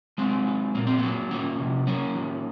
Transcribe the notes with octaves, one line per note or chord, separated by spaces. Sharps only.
F#3 G#3 C4
F#3
A#2 A#3
C4
F#3 A#3
D#3 A#3 C#4
C3
F#3 A#3 C#4
D#3